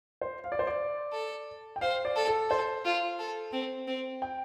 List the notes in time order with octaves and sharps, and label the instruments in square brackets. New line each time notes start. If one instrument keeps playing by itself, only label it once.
[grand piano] C5
F5
D5
C5
D5
[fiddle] A4
[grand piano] G5
[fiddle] C5 [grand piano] F5
[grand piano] D5
[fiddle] A4
[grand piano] A4
[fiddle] A4 [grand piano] C5
[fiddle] F4
A4
C4
C4
[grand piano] G5